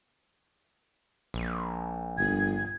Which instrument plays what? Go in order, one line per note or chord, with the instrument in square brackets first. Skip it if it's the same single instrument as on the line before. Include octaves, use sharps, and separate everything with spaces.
[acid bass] A#1
[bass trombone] G1 [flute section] G#6